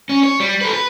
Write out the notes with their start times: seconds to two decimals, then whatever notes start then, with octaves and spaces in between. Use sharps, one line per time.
0.09 C#4
0.23 C#5
0.40 G3
0.61 A4 B4
0.73 B4